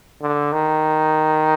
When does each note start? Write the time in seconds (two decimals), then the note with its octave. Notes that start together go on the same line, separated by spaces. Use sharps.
0.22 D3
0.52 D#3